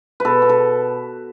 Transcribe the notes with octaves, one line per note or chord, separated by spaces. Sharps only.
B2 A4 B4
B2
A4